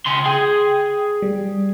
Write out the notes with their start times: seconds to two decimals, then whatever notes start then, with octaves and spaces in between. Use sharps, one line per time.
0.06 C#3 C6
0.26 G#4 G5
1.22 G3